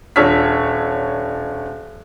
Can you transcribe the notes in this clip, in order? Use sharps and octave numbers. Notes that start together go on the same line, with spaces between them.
D#1 D4 C#5 E6 F6 B6